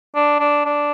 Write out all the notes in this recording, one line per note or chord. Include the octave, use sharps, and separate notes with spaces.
D4
D4
D4